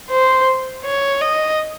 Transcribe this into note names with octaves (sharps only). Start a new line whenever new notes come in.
C5
C#5
D#5